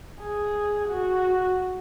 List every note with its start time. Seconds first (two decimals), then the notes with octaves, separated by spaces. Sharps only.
0.21 G#4
0.88 F#4